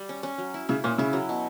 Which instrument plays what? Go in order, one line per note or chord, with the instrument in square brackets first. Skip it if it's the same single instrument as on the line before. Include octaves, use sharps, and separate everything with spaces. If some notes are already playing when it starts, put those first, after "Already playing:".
Already playing: [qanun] G3
C#4
C#4
F#3
E4
[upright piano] C#3 [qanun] E4
[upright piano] A#2 [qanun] C#4
[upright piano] C#3 [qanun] E4
[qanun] F#3
B2